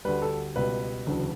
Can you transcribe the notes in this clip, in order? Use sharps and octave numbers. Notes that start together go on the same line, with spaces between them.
D2 D3 G3 B4
A4
C#2 B2 G3 B4
E1 D2 C#3 F#3